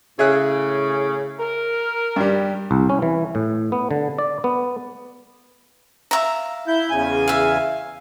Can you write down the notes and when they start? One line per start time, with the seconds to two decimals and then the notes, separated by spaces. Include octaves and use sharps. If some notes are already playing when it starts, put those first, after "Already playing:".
0.19 A2 C#3 G#4 E5 F#6
1.40 A#4
2.16 G2 G3
2.71 C2
2.89 C#4
3.02 E3
3.35 A2
3.72 B3
3.91 D3
4.19 D5
4.44 B3
6.11 E5 F5 A#5
6.67 E4 G6
6.90 E2 C#3 G#5
7.28 E5 F5